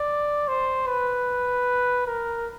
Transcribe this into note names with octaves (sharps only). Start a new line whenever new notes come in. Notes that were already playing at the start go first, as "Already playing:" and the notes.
Already playing: D5
C5
B4
A#4